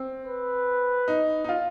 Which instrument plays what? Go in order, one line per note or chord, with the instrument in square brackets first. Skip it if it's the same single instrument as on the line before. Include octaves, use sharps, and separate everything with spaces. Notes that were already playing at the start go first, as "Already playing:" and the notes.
Already playing: [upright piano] C4
[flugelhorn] B4
[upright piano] D#4
D#4
F4